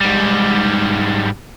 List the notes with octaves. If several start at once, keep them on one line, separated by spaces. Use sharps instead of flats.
G#2 G3